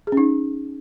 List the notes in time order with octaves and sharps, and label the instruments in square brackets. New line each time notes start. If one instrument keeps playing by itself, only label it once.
[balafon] G#4
C#4
D#4